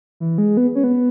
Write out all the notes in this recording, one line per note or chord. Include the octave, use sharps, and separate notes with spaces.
E3
G#3
B3
C#4
B3